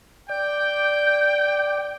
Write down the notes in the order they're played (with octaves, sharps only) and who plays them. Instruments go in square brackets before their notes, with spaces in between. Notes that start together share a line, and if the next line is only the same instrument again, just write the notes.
[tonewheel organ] D5 [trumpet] G5 [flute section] G6